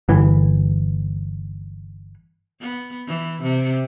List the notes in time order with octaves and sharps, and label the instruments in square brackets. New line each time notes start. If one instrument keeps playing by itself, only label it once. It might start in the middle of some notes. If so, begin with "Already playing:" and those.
[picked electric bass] G1 E3
[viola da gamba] B3
E3
C3